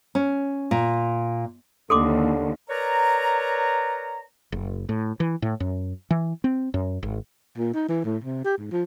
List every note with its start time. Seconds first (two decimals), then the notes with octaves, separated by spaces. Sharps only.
0.15 C#4
0.71 A#2
1.90 D#2 D3 A4 C6 D6
2.69 A#4 B4 C#5 D5 A#5
4.52 F#1
4.89 A2
5.20 E3
5.42 A2
5.60 F#2
6.11 E3
6.44 C4
6.74 F#2
7.03 G#1
7.58 A#2
7.74 D#4
7.89 E3
8.05 A2
8.24 C3
8.45 G4
8.58 G#2
8.71 F3